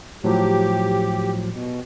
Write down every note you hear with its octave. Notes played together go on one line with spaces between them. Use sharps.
A2 F3 F#3 G4
B2